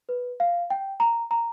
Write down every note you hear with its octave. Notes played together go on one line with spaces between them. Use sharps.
B4
F5
G5
A#5
A#5